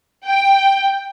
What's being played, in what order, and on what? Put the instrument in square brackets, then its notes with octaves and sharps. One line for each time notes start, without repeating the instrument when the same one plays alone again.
[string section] G5